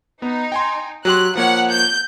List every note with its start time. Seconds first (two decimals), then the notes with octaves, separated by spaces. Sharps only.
0.22 B3 D#4
0.52 G5 G#5 C6
1.05 F#3 G4 C6 F#6
1.35 F3 A#3 C#5 F#5
1.70 G6